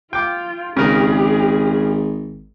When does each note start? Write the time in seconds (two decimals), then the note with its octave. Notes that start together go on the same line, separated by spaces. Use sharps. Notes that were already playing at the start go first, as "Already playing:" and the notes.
0.13 F4 G5 D6
0.77 G#1 C#3 G#4 A#4